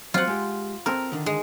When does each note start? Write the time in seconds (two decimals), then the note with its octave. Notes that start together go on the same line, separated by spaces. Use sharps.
0.14 F3 F#3 C4 F4 F#5
0.27 G#3 G4
0.86 C4 A4 A#4 A#5
1.12 D3 D#3
1.26 G#3